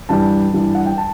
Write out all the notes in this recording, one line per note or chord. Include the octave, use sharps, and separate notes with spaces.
G2 E3 G3 A5
G2 E3 G3
F#5
G5
A5